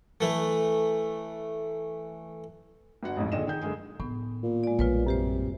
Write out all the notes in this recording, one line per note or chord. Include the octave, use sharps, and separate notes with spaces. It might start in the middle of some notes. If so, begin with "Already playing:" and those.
E3 A3
G1 F#4 F#5
A1 F2 G#2
A#2 D3 D#3 G#4 D#5 E7
D#3 G#4 G6
F#1 D3 G#3 G#4
A2 D#3 B3
A#2
G#3 D5
A#1 G3 F4 B4 C#5
F#2 C3 G4 C5